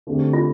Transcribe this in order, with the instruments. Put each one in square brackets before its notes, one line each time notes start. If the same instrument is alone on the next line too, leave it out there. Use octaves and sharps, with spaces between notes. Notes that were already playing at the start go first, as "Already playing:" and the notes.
[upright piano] D3 A3 C4 G4
[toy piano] F4